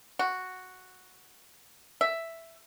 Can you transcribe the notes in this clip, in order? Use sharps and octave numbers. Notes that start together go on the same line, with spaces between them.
F#4
E5